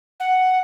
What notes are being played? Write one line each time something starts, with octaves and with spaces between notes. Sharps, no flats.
F#5